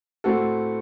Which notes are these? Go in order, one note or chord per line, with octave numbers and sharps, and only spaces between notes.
A2 A3 C4 F#4 A4